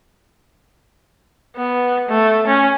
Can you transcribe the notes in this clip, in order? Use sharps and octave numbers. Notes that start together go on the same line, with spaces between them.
B3
A3
C#4